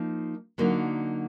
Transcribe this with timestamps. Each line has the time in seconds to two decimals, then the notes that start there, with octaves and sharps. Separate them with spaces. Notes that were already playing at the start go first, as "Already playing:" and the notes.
Already playing: F3 A#3 D#4
0.58 D3 F#3 A#3 D#4